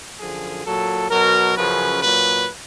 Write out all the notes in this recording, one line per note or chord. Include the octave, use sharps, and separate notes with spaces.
F#2 D3 F3 G#4
A#2 F#3 A4
B2 F#3 A#4
F#2 C#3 F3 B4
A#2 F#3 B4